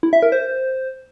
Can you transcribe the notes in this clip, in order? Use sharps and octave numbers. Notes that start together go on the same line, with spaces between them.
E4
E5
A#4
C5